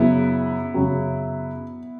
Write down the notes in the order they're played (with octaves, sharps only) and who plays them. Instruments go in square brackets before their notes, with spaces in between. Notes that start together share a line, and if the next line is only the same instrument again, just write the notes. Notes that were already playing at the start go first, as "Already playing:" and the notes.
Already playing: [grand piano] F#2 C#3 F#3 [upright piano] B3 E4
[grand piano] F#2 C#3 F#3